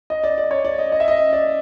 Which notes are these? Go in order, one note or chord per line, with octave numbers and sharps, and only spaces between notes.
D#5
D5
D5
C#5
D5
D#5
D#5
E5
D#5
D5